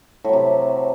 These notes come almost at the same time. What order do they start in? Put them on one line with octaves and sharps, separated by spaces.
A2 F#3 C3